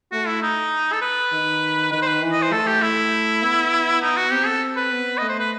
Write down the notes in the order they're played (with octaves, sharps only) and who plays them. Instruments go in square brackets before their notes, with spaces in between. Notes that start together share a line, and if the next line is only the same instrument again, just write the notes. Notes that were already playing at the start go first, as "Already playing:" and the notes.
[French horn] A3 [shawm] F#4
[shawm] E4
D#4
A4
B4
[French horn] D#3
[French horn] D#3 [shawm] B4
[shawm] C5
B4
[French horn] E3
[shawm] D#5
C5
[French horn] A3 [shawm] A4
[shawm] G4
[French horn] A3 [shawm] E4
[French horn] B3
[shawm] D#4
F#4
[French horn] C4 [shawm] G4
[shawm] A4
B4
[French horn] B3
[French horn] A3 [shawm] D#5
[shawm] C5
B4